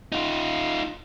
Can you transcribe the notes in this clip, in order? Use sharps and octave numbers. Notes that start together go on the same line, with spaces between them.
D#4 F4